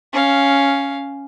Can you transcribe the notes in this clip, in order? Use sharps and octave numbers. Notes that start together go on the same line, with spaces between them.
C#4 F5